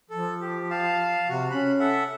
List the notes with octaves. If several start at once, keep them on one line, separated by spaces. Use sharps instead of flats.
F3 A4
G4
F5 A5
C3 F#4
C#4 B5 F#6
A4 E5 F#5